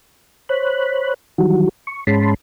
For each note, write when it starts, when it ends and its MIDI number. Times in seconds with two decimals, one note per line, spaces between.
0.49 1.14 72
0.49 1.14 73
0.49 1.14 83
0.49 1.14 90
1.38 1.69 51
1.38 1.69 52
1.38 1.69 54
1.38 1.69 55
1.38 1.69 66
1.87 2.04 85
2.07 2.34 44
2.07 2.34 56
2.07 2.34 61
2.07 2.34 81
2.07 2.34 83
2.07 2.34 84